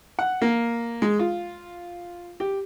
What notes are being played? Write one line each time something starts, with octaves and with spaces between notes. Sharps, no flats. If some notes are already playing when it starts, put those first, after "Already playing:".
F#5
A#3
G#3
F4
G4